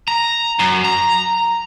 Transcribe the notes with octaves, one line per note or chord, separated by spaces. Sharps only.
A#5
F#2
A#5